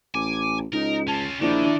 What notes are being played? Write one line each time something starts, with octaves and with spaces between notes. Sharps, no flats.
A1 G#5 D6
C#2 D#4 A#4
C#4 F4 A5
A#1 D#3 D4 E4